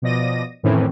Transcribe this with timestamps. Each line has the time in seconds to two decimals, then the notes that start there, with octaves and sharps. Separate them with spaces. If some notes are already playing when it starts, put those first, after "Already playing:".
0.02 B2 F3 D5 D#5 A#6 D#7
0.63 F2 A2 D#3 E3 C4 C#4